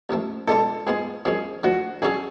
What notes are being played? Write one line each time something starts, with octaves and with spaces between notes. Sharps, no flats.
A1 A2 F3 A3
C#2 B2 G#3 D4 F4 A4
G#2 G#3 B3 F4 G#4
F#2 F3 G#3 C#4 G#4
D2 D3 F3 F#4
D3 F#3 C#4 F#4 G#4 A4